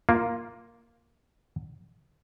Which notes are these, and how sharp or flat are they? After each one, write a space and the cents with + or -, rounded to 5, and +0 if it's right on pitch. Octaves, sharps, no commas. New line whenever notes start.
A#3 +0 F4 +0